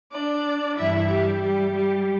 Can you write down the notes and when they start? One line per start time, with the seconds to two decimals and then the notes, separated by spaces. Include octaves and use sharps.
0.11 D4 D5
0.77 G2 E3 G3 E4 E5
1.10 G3 G4
1.42 G3 G4
1.75 G3 G4